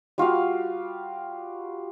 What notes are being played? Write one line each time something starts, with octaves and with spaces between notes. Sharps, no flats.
G3 F4 F#4 F5